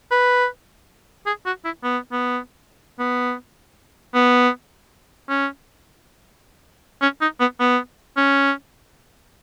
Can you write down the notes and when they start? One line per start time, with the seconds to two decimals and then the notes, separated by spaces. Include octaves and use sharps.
0.11 B4
1.26 G#4
1.46 F#4
1.65 E4
1.84 B3
2.12 B3
2.99 B3
4.14 B3
5.29 C#4
7.02 C#4
7.21 D#4
7.40 B3
7.60 B3
8.17 C#4